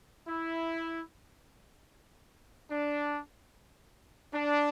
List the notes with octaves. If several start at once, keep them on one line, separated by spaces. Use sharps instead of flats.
E4
D4
D4